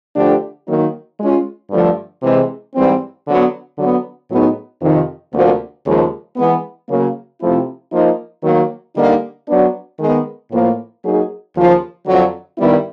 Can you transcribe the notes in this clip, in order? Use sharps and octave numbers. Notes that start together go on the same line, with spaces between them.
D3 F3 A3 D4 G4
D#3 F#3 A#3 D#4
G#3 C#4 F4
G2 D3 F3 A3
C3 E3 G#3 C4
G#2 E3 G3 C4
D3 F#3 B3
D3 F#3 B3
A2 F#3 B3 D#4 G#4
F2 C3 D#3
D2 C3 F3 A#3
D#2 C#3 F3 G#3
E3 G#3 B3
C#3 F#3 A#3
C3 F3 A3 C4 E4
F3 A#3 D#4
D#3 F#3 A#3
D3 G3 A#3 D#4
F#3 B3 D4
D#3 G#3 B3
A2 F3 A#3
F#3 A#3 D#4 G#4
D#2 C#3 F3
F2 D3 F#3
G2 D#3 G3 B3 E4